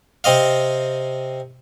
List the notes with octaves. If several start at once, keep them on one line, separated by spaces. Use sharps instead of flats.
C3 C4 D#5 F5